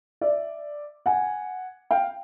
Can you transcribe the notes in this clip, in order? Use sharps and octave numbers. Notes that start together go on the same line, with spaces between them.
D5 E5
F#5 G#5
F5 G5